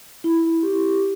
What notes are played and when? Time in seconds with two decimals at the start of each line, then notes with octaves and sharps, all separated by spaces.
0.24 E4
0.63 G4